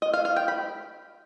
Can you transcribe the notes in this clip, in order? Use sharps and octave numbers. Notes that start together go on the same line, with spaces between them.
D#5
F5
F5
G5
B5